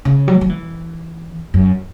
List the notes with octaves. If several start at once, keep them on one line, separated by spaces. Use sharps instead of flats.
C#3
F#3
F#3
E3
F#2